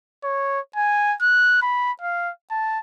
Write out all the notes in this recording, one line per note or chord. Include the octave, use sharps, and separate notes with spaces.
C#5
G#5
F#6
B5
F5
A5